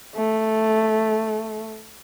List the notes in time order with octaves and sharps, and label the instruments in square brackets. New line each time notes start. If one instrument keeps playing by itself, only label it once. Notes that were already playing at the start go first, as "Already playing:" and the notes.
[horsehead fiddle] A3